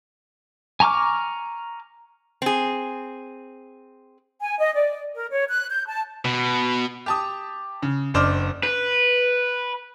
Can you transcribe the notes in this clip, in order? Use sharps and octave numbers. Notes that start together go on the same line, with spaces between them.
G#5 A#5 C#6 D6 F6
C4 G#4
G#5
D#5
D5
A#4
C#5
F#6
G6
A5
B2
G4 A5 D#6
C#3
F#1 D4 C5 D#5 D6 F6
B4